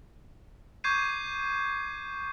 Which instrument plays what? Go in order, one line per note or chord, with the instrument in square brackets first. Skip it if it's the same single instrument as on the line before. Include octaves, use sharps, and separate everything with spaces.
[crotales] C#6 D6 G6 G#6 C7 D#7